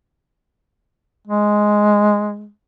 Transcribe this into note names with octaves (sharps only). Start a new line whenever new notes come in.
G#3